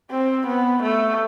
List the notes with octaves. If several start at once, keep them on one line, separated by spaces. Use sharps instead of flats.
C4
B3
A3